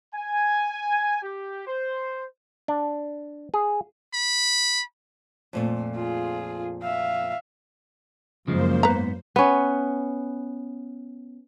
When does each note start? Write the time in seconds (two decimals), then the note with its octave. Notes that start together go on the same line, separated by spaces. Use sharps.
0.14 G#5
1.22 G4
1.67 C5
2.68 D4
3.54 G#4
4.14 B5
5.53 F2 A#2 A3
5.95 F4 G#4
6.82 E5 F5
8.48 F#2 C#3 F3 G#3 A#3 C5
8.83 G#2 B3 B4 A#5
9.36 B3 C#4